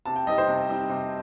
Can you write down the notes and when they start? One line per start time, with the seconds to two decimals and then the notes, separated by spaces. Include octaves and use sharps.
0.05 C3 A5
0.16 G5
0.27 G3 C4 D#4 D#5
0.38 C5
0.48 C3
0.69 G3 C4 D#4
0.89 C3